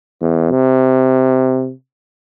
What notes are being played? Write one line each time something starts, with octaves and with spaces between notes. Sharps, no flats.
E2
C3